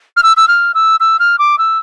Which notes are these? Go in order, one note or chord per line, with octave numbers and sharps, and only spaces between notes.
F6
E6
E6
F6
E6
E6
F6
D6
E6